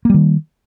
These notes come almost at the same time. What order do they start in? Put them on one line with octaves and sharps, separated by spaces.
A#3 G3 D#3